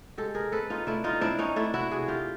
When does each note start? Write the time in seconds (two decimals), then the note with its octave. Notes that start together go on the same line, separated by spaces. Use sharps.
0.18 G#3 G4 A4
0.35 G#4 A#4
0.52 C4 A4 B4
0.70 D#4 F4
0.87 A3 D4 E4
1.04 D#4 F4
1.21 C4 D4 E4
1.39 C#4 D#4
1.56 A3 D4 E4
1.74 E4 F#4
1.91 C3 F#4 G#4
2.08 F4 G4